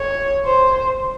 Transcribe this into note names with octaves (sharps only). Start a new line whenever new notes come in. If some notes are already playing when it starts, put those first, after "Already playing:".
Already playing: C#5
C5